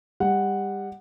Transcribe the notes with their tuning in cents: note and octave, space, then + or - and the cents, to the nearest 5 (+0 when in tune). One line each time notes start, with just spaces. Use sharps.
G3 +25 F#5 +0